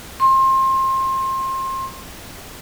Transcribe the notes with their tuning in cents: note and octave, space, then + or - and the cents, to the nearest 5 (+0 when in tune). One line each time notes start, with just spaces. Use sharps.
C6 +25